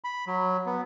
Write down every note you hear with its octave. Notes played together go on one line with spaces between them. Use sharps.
B5
F#3
B3